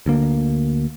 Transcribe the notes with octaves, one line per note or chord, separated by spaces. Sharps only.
D2 D3 A#3